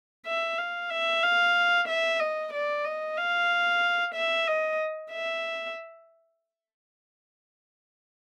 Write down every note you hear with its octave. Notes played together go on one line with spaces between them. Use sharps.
E5
F5
E5
F5
E5
D#5
D5
D#5
F5
E5
D#5
E5